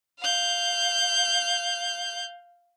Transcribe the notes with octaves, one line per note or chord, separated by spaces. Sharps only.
F5 G6